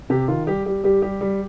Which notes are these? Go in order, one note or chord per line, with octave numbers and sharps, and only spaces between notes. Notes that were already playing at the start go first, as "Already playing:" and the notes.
C3 G4
D#3 F4
G3 G4
G3 G4
G3 G4
G3 G4
G3